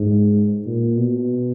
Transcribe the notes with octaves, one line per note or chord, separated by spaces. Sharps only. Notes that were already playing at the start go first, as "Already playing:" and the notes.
Already playing: G#2
A#2
B2